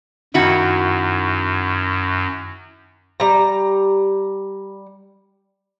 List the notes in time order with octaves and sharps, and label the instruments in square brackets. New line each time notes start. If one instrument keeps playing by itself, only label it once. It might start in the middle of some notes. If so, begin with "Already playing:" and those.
[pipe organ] F#2 [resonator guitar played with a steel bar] D#3 E4 F#4
[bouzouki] G3 A#5